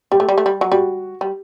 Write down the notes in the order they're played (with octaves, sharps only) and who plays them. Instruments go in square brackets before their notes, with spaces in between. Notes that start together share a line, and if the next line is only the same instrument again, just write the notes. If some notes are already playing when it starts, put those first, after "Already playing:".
[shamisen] G3 [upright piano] G4
[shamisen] A3
G3
A3
G3
F#3
[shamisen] G3 [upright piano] F#4
[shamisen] G3